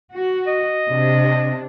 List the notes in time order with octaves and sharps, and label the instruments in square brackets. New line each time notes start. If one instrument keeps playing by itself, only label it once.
[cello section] F#4
[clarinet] D#5
[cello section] C3 D4